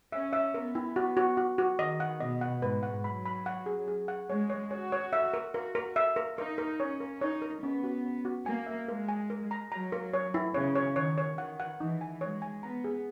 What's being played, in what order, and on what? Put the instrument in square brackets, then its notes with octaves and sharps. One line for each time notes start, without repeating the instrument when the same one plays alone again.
[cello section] C#4 [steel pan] E5
[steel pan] E5
[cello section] B3 [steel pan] A#4
[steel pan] E4
[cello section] B3 [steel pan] F#4
[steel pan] F#4
F#4
F#4
[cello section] D#3 [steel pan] D#5
[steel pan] F#5
[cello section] B2 [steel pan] D#5
[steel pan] F#5
[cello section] G#2 [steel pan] B4
[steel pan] F#5
[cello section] F#3 [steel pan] B5
[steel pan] B5
F#5
G#4
G#4
F#5
[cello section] G#3 [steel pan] C#5
[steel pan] C#5
[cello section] F#4 [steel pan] C#5
[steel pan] C#5
E5
A#4
[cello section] F#4 [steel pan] A#4
[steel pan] A#4
E5
A#4
[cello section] D#4 [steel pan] A#4
[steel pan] A#4
[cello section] C#4 [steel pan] C#5
[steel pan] A#4
[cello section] D#4 [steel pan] C#5
[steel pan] A#4
[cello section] B3 [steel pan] C#4
[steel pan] F#4
C#4
F#4
[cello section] A#3 [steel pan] G#5
[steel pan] E5
[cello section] G#3 [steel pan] A#4
[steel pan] G#5
A#4
A#5
[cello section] F#3 [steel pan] A#5
[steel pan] A#4
C#5
E4
[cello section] C#3 [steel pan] C#5
[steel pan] C#5
[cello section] D#3 [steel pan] C#5
[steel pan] C#5
[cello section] D#3 [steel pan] F#5
[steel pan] F#5
[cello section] E3 [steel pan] D#4
[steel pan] G#5
[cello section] G#3 [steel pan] C#5
[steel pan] G#5
[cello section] B3 [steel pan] A#5
[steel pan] G#4